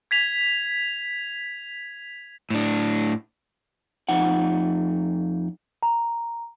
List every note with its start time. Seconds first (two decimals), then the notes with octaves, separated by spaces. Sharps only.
0.11 G#6 B6 F7
2.50 A2 D4
4.09 F2 D#4 F#5
5.83 A#5